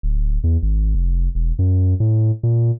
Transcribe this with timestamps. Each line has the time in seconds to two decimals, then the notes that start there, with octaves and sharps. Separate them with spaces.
0.03 D1
0.44 E2
0.63 G#1
0.95 F1
1.35 E1
1.59 F#2
2.00 A2
2.43 A#2